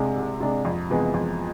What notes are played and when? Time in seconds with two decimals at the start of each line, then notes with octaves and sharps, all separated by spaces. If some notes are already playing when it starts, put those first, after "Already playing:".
Already playing: C2 C3 G#3 D4
0.17 C2
0.40 C3 G#3 D4
0.65 F2
0.90 C3 E3 G#3 B3
1.14 F2